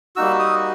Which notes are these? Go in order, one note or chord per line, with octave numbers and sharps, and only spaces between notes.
G3 A#3 D#4 F#4 E6
D#6